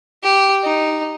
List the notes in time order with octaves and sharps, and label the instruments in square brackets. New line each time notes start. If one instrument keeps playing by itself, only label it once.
[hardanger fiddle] G4
D#4